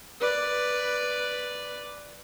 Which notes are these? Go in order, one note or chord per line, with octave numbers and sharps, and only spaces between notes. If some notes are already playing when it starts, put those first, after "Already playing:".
B4 D5